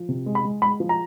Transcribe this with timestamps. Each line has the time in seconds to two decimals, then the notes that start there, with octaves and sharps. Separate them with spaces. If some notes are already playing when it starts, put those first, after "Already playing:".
Already playing: F3
0.09 C3
0.26 G#3
0.35 B5
0.45 G#3
0.62 G#3 B5
0.80 F3
0.89 A#5